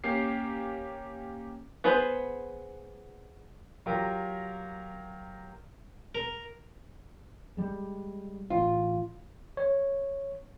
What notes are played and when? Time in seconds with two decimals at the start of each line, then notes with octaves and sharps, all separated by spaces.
0.04 A#3 C#4 G4 C7
1.84 B3 G#4 B4 C5
3.86 F#3 F4 G4 A#4
6.15 A#4
7.57 G3 G#3
8.50 A1 F4
9.57 C#5